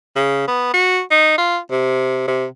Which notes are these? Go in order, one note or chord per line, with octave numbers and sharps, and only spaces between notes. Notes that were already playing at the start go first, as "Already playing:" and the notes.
C#3
B3
F#4
D#4
F4
C3
C3